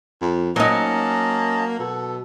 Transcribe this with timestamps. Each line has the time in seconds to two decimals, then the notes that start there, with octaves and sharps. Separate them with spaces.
0.22 F2
0.56 F#3 A#3 C#4 D#4 D#5 A5
1.79 B2 A4